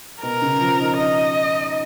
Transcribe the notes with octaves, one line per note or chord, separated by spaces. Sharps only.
B2 A#4
C#3
F3
D#4
D#4 D#5